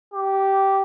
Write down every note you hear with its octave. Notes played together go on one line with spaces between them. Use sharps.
G4